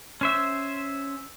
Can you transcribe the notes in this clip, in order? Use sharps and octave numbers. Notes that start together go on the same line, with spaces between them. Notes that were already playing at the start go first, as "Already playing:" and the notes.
C#4 C5 E5